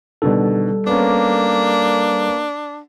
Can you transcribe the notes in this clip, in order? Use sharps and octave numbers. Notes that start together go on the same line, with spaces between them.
B2 D3 D#3 G3 A4
A#3 B3 C#4 D4